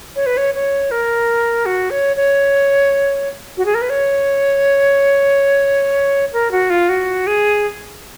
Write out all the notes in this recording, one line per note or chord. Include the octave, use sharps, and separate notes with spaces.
C#5
B4
C#5
C#5
A#4
F#4
C#5
C#5
F#4
G#4
A#4
B4
C#5
A#4
F#4
F4
F#4
G#4